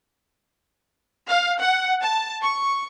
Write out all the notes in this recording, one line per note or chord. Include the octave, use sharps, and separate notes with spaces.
F5
F#5
A5
C#6